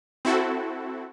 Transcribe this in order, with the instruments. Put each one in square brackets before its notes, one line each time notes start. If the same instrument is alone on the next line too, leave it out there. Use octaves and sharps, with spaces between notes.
[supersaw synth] C4 E4 F#4 A4